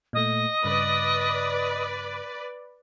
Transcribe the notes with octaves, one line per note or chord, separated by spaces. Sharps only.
A#2 A3 D#5
G2 C#3 B4 D5